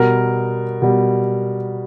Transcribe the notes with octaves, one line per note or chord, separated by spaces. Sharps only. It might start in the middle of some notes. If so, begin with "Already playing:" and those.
Already playing: B2 G3 A#4
B2 G3